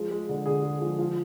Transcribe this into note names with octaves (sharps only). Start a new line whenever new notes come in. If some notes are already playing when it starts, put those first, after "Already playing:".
Already playing: F3 G#3
G#3
D3
D3 G#4
G#3
F3
F3